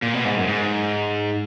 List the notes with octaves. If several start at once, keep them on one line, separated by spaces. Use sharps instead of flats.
A#2
B2
G#2
F#2
G#2